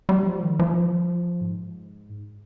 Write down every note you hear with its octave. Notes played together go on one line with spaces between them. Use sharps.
G3
F3
D#3
F3
G#2